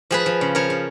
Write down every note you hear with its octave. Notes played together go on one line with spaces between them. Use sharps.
F3 G#4 B4
F3
C#3
F3 A#4 C#5
C#3